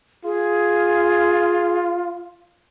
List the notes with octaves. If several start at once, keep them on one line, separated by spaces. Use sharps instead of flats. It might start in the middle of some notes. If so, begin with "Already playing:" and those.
F4 G#4